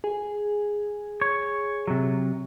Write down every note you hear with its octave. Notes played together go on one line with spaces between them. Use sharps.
G#4
C#5
C3 F#3